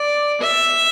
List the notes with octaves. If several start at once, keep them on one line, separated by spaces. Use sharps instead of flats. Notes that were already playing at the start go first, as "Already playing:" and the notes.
Already playing: D5
E5